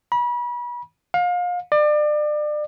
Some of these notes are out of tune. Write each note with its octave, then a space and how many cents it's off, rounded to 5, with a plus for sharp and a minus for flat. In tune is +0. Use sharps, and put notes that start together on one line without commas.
B5 -35
F5 +30
D5 +30